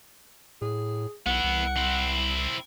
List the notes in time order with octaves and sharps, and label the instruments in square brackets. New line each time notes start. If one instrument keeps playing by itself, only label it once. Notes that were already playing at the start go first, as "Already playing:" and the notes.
[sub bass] A2 [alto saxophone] G#4
[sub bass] B1 [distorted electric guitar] B3 E4 [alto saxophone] F#5
[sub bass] C2
[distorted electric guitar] C4 E4